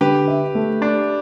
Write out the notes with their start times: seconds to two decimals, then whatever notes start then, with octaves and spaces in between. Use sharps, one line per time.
0.01 D3 G4 B4
0.28 E5
0.55 A3
0.81 D4 G4